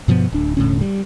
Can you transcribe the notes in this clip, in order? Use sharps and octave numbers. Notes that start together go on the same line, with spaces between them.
G2 B2 F3 B3
D1 D4
E1 A2 D3 C#4
G3